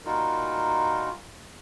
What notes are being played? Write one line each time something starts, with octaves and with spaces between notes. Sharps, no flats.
A#2 G3 D#4 F4 F#4 A#4